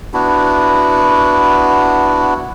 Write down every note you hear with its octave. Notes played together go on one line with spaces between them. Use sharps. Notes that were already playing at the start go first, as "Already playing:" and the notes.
B3 D4 E4 F#4